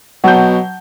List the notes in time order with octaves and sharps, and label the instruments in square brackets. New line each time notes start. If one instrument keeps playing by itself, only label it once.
[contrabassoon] B2 [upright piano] F#3 G6 [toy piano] F#5 A5